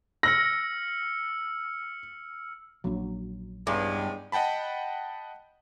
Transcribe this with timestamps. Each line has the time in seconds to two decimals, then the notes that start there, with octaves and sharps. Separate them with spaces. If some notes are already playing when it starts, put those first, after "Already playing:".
0.23 E6 F6 A#6 C#7
2.84 A#1 F#3 A#3 D4
3.67 E2 G2 C#3 G#3
4.32 D#5 F#5 G5 A5 B5